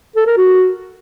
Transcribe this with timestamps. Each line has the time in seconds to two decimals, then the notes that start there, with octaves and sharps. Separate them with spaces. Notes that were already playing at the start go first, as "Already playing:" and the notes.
0.16 A4
0.27 A#4
0.37 F#4